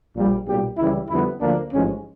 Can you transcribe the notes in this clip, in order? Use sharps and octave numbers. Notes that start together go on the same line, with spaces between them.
A#1 A#2 G3
B1 A#2 G3 G4
C#2 C#3 E3 G3 E4
F2 D3 G3 B3 E4
D2 D3 F3 A#3 D4
A1 G#2 F3 G#3 C#4